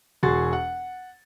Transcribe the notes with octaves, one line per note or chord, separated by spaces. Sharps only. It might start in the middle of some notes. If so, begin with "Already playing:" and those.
E1 F#4 G#4 C6 C#6 A6
F#5